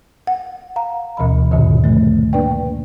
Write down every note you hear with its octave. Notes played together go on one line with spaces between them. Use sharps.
F#5
F5 A#5
D2 B2 E3 D#5 B5
D2 G2 A#2 D3 D#3
F3 A3
A#3 D4 B4 D5 G5